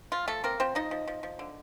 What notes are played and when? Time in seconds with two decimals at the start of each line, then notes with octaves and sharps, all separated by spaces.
0.12 F3 F4
0.28 F3 A3 A4
0.44 A#3 C4 A#4
0.60 F3 C4 C5
0.75 F3 D#4 D#5
0.91 F3
1.08 F3
1.23 F3
1.39 D3